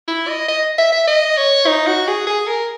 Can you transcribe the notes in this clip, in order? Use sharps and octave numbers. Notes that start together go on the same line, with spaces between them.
E4
D#5
D#5
E5
E5
D#5
C#5
D#4
F#4
G#4
G#4
A#4